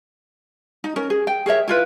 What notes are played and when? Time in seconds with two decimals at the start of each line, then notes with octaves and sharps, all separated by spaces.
0.84 D#4
0.96 C#4 A#4
1.10 G#4
1.27 G5
1.46 G#4 A#4 C#5 E5
1.68 E4 F4 B4